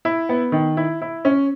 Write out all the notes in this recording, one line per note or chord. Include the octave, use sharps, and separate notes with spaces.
E4
B3
D#3
E4
E4
C#4